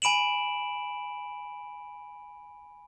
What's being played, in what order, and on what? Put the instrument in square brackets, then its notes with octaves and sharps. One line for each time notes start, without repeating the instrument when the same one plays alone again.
[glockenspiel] G#5 B5 D7 E7 F#7